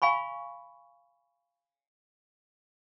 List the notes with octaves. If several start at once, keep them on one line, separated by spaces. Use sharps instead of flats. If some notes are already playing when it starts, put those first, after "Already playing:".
F5 G#5 B5 C#6